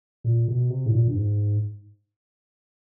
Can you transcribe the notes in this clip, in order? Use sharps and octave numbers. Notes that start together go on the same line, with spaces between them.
A#2
B2
C3
A2
A#2
G2
G#2